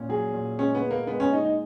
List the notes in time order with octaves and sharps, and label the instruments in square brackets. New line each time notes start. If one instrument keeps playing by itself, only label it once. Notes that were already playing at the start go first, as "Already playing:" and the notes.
Already playing: [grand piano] A#2 C#4
[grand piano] F#3 [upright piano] G#4
[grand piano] A#2
[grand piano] G#3 [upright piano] C#4
[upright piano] B3
[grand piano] G#3
[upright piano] A#3
[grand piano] G#3 [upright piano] B3
[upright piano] C#4
[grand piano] G#3 [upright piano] D#4
[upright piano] D#4